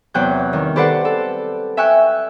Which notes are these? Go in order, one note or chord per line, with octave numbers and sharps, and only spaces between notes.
E2 C3 F#3 G5 F#6 G6
D#3 G3
G4 A4 B4 C5 D5 F#5
A4
E5 G5 G#5 C#6 F#6